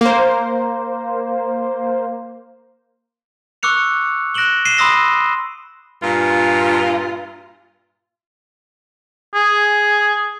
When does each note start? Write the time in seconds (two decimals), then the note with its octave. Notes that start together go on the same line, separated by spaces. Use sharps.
0.01 A#3 C5
3.63 C#6 D6 E6 F#6 C#7 F7
4.34 F#6 A#6 D7 E7 F#7 G7
4.65 C7 D#7 E7 G7
4.78 B5 C6 D#6 E6 A#6
6.02 G2 A#2 F4
9.34 G#4